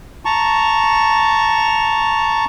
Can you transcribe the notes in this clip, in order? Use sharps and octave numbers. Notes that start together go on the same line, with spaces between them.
A5 A#5 C#6